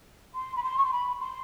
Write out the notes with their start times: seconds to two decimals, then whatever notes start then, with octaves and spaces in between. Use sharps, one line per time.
0.34 C6
0.56 B5
0.63 C6
0.77 C#6
0.84 C6
0.92 B5
1.20 C6